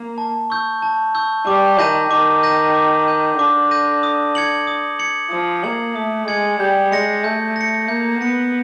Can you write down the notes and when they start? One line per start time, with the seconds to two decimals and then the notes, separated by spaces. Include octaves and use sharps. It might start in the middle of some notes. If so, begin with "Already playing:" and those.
Already playing: A#3
0.18 A5
0.50 C#6 E6 G6
0.82 A5
1.15 C#6 E6 G6
1.46 G3 D6
1.79 D#3 G6 A#6 D#7
2.11 D#3 D6
2.43 G6 A#6 D#7
2.75 D6
3.07 G6 A#6 D#7
3.39 D3 D6
3.71 G6 A#6 D#7
4.03 D#6
4.35 G#6 C#7 F#7
4.67 D#6
4.99 G#6 C#7 F#7
5.31 F3 D#6
5.63 A#3 G#6 C#7 F#7
5.95 A3 D#6
6.28 G#3 G#6 C#7 F#7
6.60 G3 G6
6.91 G#3 A#6 C#7
7.24 A3 G6
7.56 A#6 C#7
7.88 A#3 G6
8.21 B3 A#6 C#7